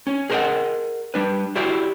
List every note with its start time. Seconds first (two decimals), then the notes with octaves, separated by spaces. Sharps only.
0.07 C#4
0.30 G#4 A#4 C5 D5 D#5 F#5
1.14 G3 D4 B4
1.55 E4 F#4 G4 C5 D5 E5